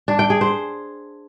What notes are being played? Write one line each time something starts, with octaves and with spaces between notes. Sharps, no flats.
D4
G5
G#4
C5